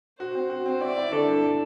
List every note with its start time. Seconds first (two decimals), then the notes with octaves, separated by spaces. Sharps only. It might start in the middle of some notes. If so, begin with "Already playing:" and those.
0.20 F#4 C5
0.35 C4
0.50 F#4
0.66 C4
0.81 E4 D5
0.96 E4
1.12 D3 A4
1.27 G2
1.42 D4